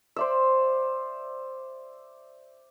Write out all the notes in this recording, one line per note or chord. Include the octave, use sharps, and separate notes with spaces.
C5 D5 E5